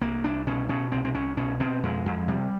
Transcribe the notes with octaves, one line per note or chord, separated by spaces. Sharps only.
C2 A#3
C2 D4
B2 C#4
B2 C#4
C2 C4
C4
C2 C#4
B2 C#4
B2 C4
F2 G#3
F2
C3 G3